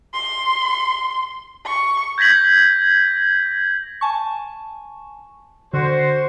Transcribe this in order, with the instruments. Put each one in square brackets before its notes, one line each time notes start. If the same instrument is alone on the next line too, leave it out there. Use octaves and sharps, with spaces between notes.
[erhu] C6
C#6
[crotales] G6 G#6 A#6 B6 F#7
[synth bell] G#5 A5 C#6
[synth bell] D3 [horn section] F#4 C5